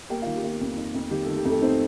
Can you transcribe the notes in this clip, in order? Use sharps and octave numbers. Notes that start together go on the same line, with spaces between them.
A#3 G4 G5
F4 F5
D#3
G4
A#3 F4
F2
D#4
F2
D#3 G4
A3 A4
D#3
G4
F2 A3 A4
C4 D#4 C5